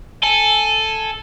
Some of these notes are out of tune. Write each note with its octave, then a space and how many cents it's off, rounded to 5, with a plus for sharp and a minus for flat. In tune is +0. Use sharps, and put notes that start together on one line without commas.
A4 +0 G#5 +5